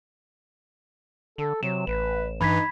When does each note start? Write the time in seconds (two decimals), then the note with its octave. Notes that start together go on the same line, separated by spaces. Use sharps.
1.38 D3 A4
1.63 C3 F#3 E7
1.87 A1 B4
2.41 G2 E3 D#4 B5 G#6 B6